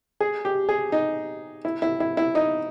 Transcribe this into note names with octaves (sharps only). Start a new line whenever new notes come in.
G#4
G4
G#4
D#4
E4
E4
E4
E4
D#4